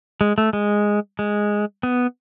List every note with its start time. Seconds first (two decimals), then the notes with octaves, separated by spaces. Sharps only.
0.21 G#3
0.38 A3
0.53 G#3
1.19 G#3
1.83 B3